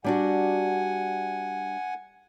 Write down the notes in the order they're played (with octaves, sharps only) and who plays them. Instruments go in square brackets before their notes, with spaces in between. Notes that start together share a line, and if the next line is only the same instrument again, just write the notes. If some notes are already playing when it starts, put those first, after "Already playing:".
[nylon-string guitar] G3 D4 F#4 [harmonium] F#5 G#5